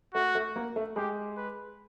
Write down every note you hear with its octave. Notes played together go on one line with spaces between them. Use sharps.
A3 F#4
A3
A#3
A3
G#3 G4
B4